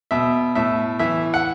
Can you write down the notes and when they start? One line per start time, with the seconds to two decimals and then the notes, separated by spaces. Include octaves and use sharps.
0.11 B2 E5
0.55 A2 E5
0.99 E3 E5
1.34 F#5